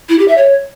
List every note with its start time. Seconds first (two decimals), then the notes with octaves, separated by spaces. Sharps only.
0.09 E4
0.18 G4
0.28 E5
0.37 C#5